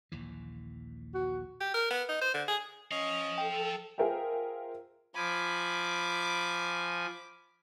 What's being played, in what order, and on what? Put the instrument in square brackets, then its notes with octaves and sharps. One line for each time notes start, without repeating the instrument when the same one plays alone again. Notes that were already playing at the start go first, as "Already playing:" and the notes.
[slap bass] A#1 D#2 E3
[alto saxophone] F#4
[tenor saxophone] G4
A#4
B3
D#4
C5
D3
G#4
[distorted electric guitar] F3 F5 [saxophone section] C#4 D#5
[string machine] A4 [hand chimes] G5
[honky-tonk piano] F4 G#4 A#4 C5 E5 G5
[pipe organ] F3 G#5 [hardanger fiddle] B5 D6